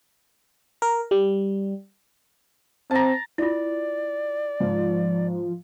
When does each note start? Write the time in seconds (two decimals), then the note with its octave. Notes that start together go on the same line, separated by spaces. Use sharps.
0.82 A#4
1.11 G3
2.91 C4 A5 A#5
3.38 E4 F4 D5
4.60 G#2 F3